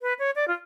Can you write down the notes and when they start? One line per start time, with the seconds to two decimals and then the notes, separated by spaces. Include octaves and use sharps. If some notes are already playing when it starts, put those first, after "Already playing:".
0.02 B4
0.19 C#5
0.36 D5
0.48 F4